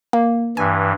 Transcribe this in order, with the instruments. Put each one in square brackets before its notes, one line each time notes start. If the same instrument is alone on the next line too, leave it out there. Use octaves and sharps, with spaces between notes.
[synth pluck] A#3
[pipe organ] G2 E3 [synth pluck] G#5